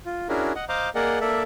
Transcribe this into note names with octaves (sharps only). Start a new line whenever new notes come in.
F4
C#4 D4 E4 F#4 G#4 A#4
D#5 F#5
C5 D#5 F5 A#5 D6
A#3 G#4 A#4 D5 D#5 F#5
A#3 A4 D5 E5